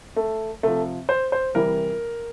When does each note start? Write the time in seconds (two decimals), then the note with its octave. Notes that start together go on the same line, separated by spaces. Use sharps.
0.16 A3
0.63 C3 F3 A3
1.09 C5
1.32 C5
1.55 C3 E3 G3 A#4